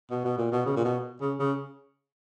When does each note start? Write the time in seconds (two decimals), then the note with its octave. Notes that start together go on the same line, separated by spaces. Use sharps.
0.11 B2
0.25 B2
0.38 A#2
0.52 B2
0.66 C#3
0.76 A#2
0.84 B2
1.21 C#3
1.39 C#3